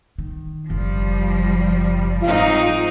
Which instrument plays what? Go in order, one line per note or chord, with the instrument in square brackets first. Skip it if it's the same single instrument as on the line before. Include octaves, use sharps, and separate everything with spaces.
[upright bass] D#3
[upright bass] F#1 [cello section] F3 G3
[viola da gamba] G#2 C4 D#4 [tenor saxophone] F4